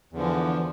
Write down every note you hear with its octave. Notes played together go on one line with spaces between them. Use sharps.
E2 D3 E3 F3